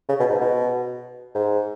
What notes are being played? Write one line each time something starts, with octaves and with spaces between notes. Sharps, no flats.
C#3
B2
G#2
B2
G#2